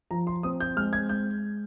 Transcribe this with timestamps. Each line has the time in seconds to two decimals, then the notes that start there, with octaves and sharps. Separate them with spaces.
0.11 F3 A#5
0.27 C6
0.43 C4 D#6
0.60 G6
0.77 G#3 F6
0.93 G#6
1.09 G#3 G6